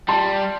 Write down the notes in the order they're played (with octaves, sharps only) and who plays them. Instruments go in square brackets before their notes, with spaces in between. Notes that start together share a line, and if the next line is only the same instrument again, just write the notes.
[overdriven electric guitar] G3 [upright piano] A5 C6